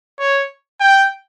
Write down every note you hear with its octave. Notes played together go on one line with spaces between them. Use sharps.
C#5
G5